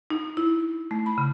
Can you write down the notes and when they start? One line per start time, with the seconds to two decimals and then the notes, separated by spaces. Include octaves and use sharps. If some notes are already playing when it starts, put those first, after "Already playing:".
0.10 D#4
0.37 E4
0.91 A3
1.06 B5
1.18 C#3